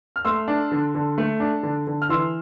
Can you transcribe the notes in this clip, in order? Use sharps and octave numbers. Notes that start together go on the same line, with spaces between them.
F6
A3 C6 E6
D4
D3
D3
A3
D4
D3
D3
F6
E3 C6 E6